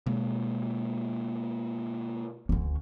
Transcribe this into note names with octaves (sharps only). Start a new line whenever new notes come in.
B2 G#3 A#3
D2 C#4